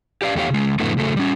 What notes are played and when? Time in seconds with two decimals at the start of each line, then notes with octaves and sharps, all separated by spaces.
0.22 G4 D5 F5
0.36 E2 A3 G4 C#5 F5
0.50 C#3 G#3
0.80 F2 A2 D3 A3 B3
0.97 C#3 F#3 A3 A4
1.16 G3 C#4